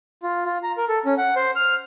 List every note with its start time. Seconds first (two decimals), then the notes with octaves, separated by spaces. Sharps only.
0.23 F4
0.45 F4
0.63 A#5
0.78 A#4
0.89 A4
1.06 C#4
1.18 F#5
1.36 C5
1.56 F6